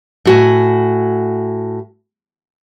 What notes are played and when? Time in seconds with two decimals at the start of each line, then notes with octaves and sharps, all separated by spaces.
0.25 A2 F#4 G#5